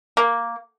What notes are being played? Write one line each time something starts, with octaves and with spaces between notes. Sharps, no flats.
A#3